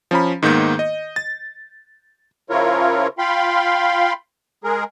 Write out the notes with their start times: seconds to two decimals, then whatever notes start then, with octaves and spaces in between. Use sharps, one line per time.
0.11 F3 C#4 A#5 B5
0.42 G#2 D#3 A#3 B3 G6 C#7
0.79 D#5
1.16 A6
2.50 C#3 F3 E4 F4 A#4 C#5
3.18 F4 F5 G5 B5 C6
4.64 G#3 G#4 A#4